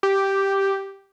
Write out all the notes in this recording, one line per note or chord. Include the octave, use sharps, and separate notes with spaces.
G4